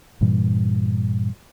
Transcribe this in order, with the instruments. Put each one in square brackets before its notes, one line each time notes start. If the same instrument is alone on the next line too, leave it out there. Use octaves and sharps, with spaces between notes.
[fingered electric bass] G2 A#2 E3 G3